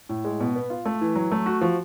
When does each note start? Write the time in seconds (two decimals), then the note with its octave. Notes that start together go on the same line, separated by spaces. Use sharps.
0.09 A2
0.25 G#3
0.40 B2
0.55 B3
0.70 F4
0.86 A3
1.01 E3
1.16 F#3
1.32 A3
1.46 F#4
1.61 F3